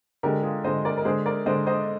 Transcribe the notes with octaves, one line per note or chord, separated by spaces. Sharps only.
D3 G#3 G4 A#4
F4 G#4
D3 G#3 C5 D#5
A#4 D5
A#4
D3 G#3 G#4 C5
A#4 D5
D3 G#3 C5 D#5
C5 D#5